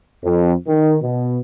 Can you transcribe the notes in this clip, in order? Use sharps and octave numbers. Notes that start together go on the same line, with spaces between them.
F2
D#3
B2